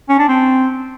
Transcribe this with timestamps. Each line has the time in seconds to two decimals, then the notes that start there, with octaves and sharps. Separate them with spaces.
0.09 C#4
0.18 D4
0.28 C4